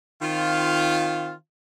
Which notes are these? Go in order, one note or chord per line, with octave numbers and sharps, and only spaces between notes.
D#3 C4 F4